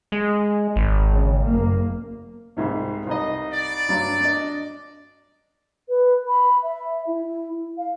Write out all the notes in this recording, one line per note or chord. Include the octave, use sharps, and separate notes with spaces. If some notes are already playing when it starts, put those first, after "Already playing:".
G#3
G#1
C#3
F#1 A#3
C2 G#2 C3
C2 D#4 D#5
D5
G2 F#3 D4
D4 D#5
B4
B5
E5
E4
F5